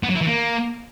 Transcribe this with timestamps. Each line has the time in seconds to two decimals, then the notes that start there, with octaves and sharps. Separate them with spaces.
0.03 B3
0.09 F#3
0.15 E4
0.21 E3
0.27 A#3